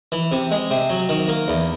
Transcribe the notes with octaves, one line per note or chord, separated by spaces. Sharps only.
E3
C3
G#3
C3
F#3
D#3
A#3
E2